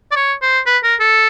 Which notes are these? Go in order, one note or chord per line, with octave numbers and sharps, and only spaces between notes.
D5
C#5
C5
B4
A#4
A4